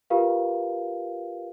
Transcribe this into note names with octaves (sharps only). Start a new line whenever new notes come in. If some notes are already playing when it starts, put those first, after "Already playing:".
F4 G4 A#4 B4 F5